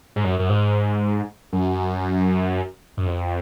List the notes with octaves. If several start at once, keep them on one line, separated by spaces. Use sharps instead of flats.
G#2
F#2
F#2
G#2
F#2
F#2
F2